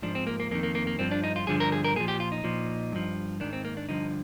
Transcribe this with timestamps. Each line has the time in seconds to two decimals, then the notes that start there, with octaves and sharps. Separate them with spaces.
0.02 G#2 F3 D4
0.15 C4
0.27 A#3
0.40 A#3
0.51 F2 A#3
0.55 D#3
0.63 A#3
0.75 A#3
0.87 A#3
0.99 G2 F3 C4
1.11 D4
1.24 D#4
1.36 F4
1.47 G2 D3 F3 G#4
1.60 A#4
1.72 G#4
1.84 A#4
1.96 A#2 G#4
2.00 F3
2.08 G4
2.20 F4
2.32 D#4
2.44 A#2 F3
2.92 G2 F3
3.40 G#2 D#3 D4
3.53 C4
3.65 A#3
3.77 D4
3.89 G2 D3 F3 D#4